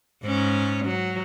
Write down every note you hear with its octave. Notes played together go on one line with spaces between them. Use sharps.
G#2 C#4
F#3